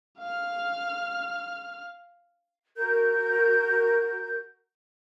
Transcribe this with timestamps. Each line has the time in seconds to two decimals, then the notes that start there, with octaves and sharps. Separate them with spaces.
0.19 F5 F6
2.76 F#4 A#4 G6